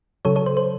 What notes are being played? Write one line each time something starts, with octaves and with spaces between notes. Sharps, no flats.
C#3 F#3 A4 C#5
A4 C#5
C5
C5